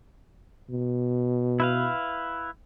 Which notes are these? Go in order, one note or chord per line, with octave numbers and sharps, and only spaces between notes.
B2
E4 B4 F5